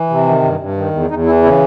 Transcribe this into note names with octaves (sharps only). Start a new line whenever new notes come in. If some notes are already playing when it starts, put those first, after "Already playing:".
Already playing: E3
C3
D#3
G2
G2
D#3
E2
E2 D#4
E3 E4
C#3 E4